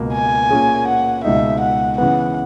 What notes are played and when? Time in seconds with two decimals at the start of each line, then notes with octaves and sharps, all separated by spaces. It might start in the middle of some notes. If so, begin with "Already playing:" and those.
Already playing: C#2 B2 A#3
0.13 G#5
0.50 A#2 A#3 C#4 G#4
0.88 F#5
1.24 C#2 B2 G#3 D#4 E5
1.61 F#5
1.98 C#3 E3 B3 F#5